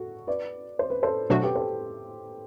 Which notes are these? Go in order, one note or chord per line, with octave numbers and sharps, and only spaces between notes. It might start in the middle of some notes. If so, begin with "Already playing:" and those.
Already playing: F#4 A4
B4 D5
C5
B4
A4 C5
B2 F#3 A3 D4 F#4 A4 C5
G4 B4
A4 C5